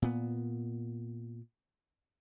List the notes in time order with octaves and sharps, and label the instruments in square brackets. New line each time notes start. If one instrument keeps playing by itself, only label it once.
[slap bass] A#2 B3